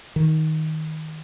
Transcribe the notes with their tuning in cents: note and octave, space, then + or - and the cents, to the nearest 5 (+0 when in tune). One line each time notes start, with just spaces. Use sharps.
D#3 +15